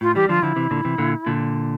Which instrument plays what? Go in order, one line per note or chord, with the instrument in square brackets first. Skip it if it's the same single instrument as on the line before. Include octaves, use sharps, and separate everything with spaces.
[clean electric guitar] A2 [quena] F4
[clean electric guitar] E3 G3 [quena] G4
[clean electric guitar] D3 F3 [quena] F4
[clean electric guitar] D3 F3 [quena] E4
[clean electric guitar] C3 E3
A#2 D3
C3 E3
A#2 D3
A#2 D3